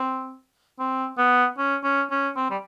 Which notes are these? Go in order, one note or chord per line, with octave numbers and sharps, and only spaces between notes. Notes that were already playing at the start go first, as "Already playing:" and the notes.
Already playing: C4
C4
B3
C#4
C#4
C#4
C4
G3